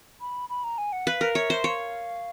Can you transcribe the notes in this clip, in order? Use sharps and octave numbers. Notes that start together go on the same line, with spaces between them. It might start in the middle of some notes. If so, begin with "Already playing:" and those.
B5
B5
A#5
G#5
F#5
B4 F5
A#4
C#5 E5
C5
C#5 F5